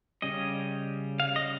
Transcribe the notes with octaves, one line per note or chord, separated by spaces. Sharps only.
C#3 G3 C#4 D#5
F5
D#5